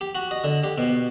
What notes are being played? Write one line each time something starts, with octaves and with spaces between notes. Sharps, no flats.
G4
F#4
D#5
D3
G4
B2